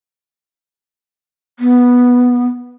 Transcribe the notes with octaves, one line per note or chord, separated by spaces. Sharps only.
B3